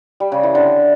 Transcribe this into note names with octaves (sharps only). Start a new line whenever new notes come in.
G3
C#3
E3
D3